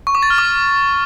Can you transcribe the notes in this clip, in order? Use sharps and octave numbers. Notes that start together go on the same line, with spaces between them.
C#6
D6
A6
F6
D6